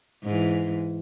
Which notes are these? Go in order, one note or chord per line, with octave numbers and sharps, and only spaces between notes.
G#2 E3